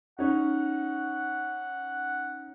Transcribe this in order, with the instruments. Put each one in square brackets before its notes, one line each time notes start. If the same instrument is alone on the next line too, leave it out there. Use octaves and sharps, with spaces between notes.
[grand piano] C#4 D#4 [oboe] F#5